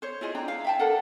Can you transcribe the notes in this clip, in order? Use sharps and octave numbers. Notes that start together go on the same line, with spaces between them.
C5 C#5
E4 F4 G#4 D#5
D4 G5 A#5
E4 F5
E5 G5 A5
D4 A4 A#4 F#5